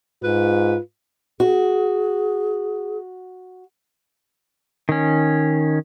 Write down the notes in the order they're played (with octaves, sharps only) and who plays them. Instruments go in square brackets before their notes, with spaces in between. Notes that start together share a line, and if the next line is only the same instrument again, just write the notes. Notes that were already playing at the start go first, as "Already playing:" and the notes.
[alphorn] G#2 [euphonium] F4 [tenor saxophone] B4
[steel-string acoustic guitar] F#4 [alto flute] G#4
[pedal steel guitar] D#3 C#4